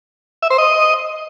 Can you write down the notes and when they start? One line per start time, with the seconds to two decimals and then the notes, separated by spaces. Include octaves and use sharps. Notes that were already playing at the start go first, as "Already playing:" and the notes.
0.43 E5
0.50 C5
0.58 D#5